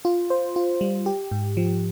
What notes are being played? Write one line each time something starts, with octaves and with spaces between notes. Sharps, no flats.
F4
C5
F4
G3
G4
G#2
F3